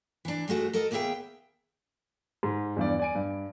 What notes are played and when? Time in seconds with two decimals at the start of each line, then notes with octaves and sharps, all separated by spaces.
0.25 E3 D4
0.48 G2 G#3 A3 F#4
0.73 A4 A#4 D#5
0.91 D#2 A#3 B3 G#4 E5 G5
2.43 G#2
2.76 E2 G2 D5
3.00 D5 G#5 D7
3.15 G2